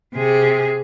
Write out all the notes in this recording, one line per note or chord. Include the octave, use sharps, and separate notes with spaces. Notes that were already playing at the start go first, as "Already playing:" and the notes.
C3 G#4